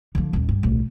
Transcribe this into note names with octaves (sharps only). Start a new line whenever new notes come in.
D3 F3
D#1 D#2
G2
D1 B1